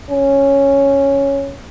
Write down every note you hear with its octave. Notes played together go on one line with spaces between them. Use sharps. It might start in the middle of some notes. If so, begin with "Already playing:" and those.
C#4